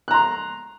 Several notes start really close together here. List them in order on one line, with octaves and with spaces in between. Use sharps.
F#6 A#5 C6